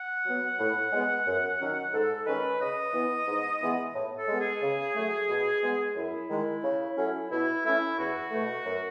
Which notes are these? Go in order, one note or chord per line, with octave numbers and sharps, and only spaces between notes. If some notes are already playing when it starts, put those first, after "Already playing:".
Already playing: F#5
F#3 B3
A2
G#3 B3
F#2
D#3 F#3 C#4
G#2 A4
D#3 G#3 C#4 B4
C#3 D#5
E3 B3
G#2
E3 G#3 B3
A2
A4
G#3 B3
G#4
C#3
F#3 A3
B2
G#3 B3
F#2 E4
D#3 G#3
C#3
F#3 A3 C#4
B2 E4
A3 C#4 E4
E2 F#4
B2 A3
F#2